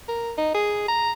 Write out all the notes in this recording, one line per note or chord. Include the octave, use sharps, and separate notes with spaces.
A#4
D#4
G#4
A#5